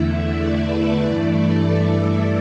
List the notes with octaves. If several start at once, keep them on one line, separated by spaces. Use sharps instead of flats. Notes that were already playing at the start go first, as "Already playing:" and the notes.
Already playing: E2 D3 A3 E4 E5
D5
B4
G2 E3 A3 E4 D5
A4
A4